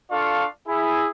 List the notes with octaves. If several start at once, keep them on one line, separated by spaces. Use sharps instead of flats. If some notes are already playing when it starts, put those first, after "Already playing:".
D4 F4 A4 D5 F5 C#6
E4 G#4